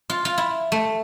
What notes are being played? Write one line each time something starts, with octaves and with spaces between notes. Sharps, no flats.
F4
F4
E4
A3